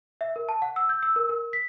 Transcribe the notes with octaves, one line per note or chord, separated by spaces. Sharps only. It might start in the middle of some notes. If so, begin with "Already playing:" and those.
E5
A#4
A5
F#5
E6
G6
E6
A#4
A#4
B6